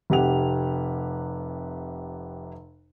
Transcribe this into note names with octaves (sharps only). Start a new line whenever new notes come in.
F1 C3 G4 F#5 F7